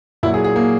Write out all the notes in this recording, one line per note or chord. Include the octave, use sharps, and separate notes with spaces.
A#2 F#3 E4
G#4
G#4
A#3